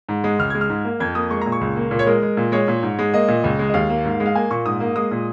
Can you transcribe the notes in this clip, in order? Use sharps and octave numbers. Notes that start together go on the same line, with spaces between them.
G#2
G#3
C#2 F6
G#3 G#6
F6
G#2
A#3
F2 G#6
A#3 D#6
G#3 C#6
A#2 A#5
C#6
C#2
A#3
A#2 A#4
C#5
G#3 A#4
G#3
A#2
G#3 C#5
A#2
G#2
G#3
A#3 D#5
A#2
C#2
G#3
D#5
D#2 F5
A#3
G#2
G#3
F5
A#3 G#5
A#2 C#6
G#2 D#6
A#3
G#3 D#6
A#2